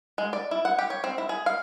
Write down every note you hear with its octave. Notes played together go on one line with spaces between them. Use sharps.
G#3
D5
E4
F#5
G4
C#5
C4
E4
G#4
F5